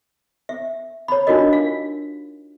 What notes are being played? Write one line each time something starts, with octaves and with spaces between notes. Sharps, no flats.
E5
C#5 B5
D4 D#4 F4 F#4 A#4 D#5
F5